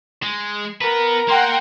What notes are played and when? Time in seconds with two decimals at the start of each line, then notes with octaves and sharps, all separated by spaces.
0.23 G#3
0.81 B3 A#4 B4
1.29 A#3 F#5 G5 C6